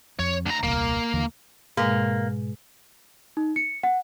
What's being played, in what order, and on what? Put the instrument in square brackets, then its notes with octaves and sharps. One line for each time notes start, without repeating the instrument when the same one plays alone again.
[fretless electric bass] F2 [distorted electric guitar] C#5
[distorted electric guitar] D2 A#5
[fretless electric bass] D#1 C2 [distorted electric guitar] A#3
[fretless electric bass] D#2 D3 E3
[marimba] G#2 B2 G#3 [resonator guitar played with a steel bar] A#3
[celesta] D#4
C#7
F#5